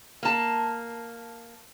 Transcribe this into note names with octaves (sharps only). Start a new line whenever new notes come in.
A#3 A5